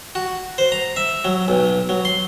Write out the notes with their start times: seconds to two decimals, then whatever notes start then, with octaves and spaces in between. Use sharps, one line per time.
0.15 F#4
0.58 C5
0.72 A#5
0.96 E5
1.25 F#3
1.48 B1
1.89 F#3
2.05 C6